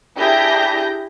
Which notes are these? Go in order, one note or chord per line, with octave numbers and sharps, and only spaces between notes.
D4 E4 G4 G#4 G6 A#6